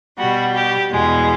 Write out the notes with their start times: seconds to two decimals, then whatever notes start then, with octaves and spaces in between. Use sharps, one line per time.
0.18 B2 G3 F#4
0.54 G4
0.89 E2 B2 G#3